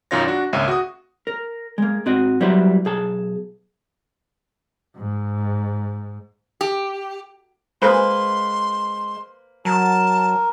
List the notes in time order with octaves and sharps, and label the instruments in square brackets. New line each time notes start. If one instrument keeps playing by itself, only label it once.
[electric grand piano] B1 F#2 D#3 F4 C#5 A#6
D4 F#4
G#1 C#2 A#3 C#5 E5 D#7
F#4 D#6
[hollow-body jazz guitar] A#4
G#3 A#3
G#2 C4 F#4 D#5
F#3 G3 A#3 E4 B4 C5
B1 G#4 A5
[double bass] G#2
[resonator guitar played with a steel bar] G4
[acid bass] G#3 [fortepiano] A#3 B4 C5 [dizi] C6
[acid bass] F#3 [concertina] A#4 [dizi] A5